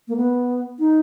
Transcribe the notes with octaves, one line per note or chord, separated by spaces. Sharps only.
A#3
B3
D#4